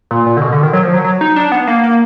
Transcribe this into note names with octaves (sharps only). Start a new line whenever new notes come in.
A#2
A#2
D3
B2
D3
D#3
F#3
F3
F#3
F#3
D#4
D4
B3
A#3
A#3